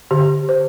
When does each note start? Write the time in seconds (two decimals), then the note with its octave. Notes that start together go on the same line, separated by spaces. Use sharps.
0.11 D3 G4
0.49 C5